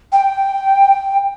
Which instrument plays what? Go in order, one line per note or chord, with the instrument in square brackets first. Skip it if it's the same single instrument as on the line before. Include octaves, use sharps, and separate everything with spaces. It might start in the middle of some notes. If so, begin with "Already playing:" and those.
[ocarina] G5